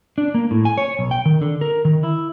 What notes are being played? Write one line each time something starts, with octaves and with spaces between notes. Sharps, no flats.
D4
A#3
A2
G#5
C#5
B1
G5
D#3
D3
A#4
D#3
E4